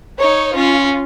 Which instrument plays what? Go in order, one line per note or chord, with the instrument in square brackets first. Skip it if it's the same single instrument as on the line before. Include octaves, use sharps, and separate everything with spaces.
[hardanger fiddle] D#4 [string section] C#5
[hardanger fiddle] C#4 [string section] F4